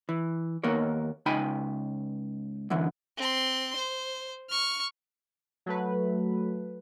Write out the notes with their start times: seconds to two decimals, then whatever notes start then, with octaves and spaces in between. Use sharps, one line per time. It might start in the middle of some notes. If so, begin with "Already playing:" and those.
0.09 E3
0.64 D#2 A#3 B3 A#4 C#5
1.26 C#2 D#4 G5 G#5 B5
2.70 F#2 D3 E3 F#3
3.17 C4 C6
3.76 C5
4.50 C#6 F6
5.66 F#3 A3 B4